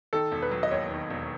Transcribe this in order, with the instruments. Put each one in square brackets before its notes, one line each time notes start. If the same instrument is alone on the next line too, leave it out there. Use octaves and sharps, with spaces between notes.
[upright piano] D#3 [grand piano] A4
[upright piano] E1
[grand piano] B4
[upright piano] F#3
[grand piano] D#5
[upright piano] D#2 [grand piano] C#5
[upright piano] D#3
E1